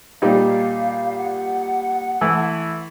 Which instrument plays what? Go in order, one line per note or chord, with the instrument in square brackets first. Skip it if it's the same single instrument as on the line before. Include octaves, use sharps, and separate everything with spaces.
[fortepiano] A#2 G3 D#4 [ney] F5
[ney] F#5
[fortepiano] E3 A3 E4